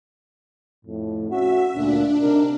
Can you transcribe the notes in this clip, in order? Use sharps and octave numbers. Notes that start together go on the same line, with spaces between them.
F2 A2
C#4 F#4 E5
D2 A#2 D4
C3 D#4 A#4